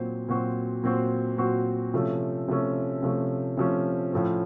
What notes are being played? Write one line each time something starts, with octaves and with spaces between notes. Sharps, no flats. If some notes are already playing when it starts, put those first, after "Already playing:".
Already playing: A#2 F#3 C4 F#4 C5
A#2 F#3 C4 F#4 C5
A#2 F#3 C4 F#4 C5
A#2 F#3 C4 F#4 C5
C3 F3 A3 C#4
C3 F3 A3 C#4
C3 F3 A3 C#4
C3 F3 A3 C#4
A2 F3 A3 C#4